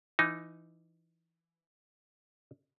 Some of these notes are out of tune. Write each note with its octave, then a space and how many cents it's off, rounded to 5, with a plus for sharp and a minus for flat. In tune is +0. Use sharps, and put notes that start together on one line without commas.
E3 +20 D#4 +0